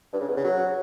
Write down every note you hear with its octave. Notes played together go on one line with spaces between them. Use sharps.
G2
C#3
E2
C#3
F#3